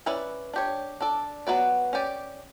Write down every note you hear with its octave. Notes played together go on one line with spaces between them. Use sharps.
C#4 E4 B4 D5
D4 G4 C#5
D4 A4 D5
F#3 B3 F#4 B4 D5
C#4 G4 D5